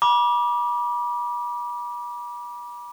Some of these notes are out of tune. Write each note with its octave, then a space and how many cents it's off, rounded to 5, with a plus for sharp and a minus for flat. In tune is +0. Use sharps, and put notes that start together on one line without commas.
B5 -40 D6 +0